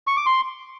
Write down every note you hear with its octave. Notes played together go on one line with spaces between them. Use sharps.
C#6
D6
C6